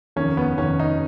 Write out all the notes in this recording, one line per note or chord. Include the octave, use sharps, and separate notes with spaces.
F1 D#2 D#3 C#4
B3
F1 D#2 D#3 C#4
D#4